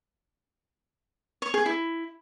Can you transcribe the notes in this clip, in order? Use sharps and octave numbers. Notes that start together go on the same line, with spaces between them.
C#5
G#4
E4